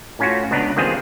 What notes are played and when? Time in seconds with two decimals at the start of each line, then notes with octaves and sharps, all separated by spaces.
0.19 A2 C#4 F4 F#4
0.51 C#2 B3 D4 A#5
0.77 D#3 G3 B3 C4 F4 G#4